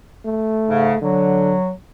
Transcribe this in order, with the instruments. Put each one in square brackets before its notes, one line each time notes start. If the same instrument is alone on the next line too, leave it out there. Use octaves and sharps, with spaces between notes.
[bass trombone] A3
[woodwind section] G#2 C#3
[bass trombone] D3 [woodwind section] F#3